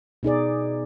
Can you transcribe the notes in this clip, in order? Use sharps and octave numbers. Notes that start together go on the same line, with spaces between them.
B2 D#4 G#4 D5